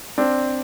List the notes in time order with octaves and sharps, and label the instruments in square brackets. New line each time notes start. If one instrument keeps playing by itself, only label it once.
[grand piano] C4 D4